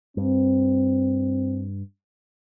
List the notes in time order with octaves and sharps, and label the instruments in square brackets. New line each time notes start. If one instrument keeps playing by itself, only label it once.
[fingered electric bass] G2 [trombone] C4